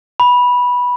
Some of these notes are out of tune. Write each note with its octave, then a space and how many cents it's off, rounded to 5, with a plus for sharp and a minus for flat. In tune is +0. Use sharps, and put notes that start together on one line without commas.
B5 -10